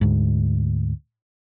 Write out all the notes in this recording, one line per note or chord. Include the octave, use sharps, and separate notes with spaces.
D2 G#2